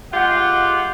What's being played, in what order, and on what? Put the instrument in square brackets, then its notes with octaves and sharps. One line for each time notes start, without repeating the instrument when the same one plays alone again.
[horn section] G#3 F4 G4 F#5